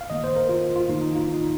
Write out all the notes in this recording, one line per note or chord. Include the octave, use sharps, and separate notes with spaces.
F5
D#3 A#3 D#5
C5
A#4
F4
F4
D#3 A#3 D#4
D#4
F4
D#4